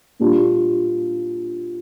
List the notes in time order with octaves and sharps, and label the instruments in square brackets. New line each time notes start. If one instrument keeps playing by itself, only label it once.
[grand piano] A#2 G3 D4 F4